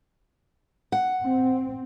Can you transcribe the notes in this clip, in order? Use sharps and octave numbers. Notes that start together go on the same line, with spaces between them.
F#5
C4